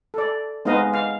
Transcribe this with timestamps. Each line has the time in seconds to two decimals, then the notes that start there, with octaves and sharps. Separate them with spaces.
0.14 A4 D5
0.65 G#3 B3 C4 D#4 D#5 F5
0.94 F5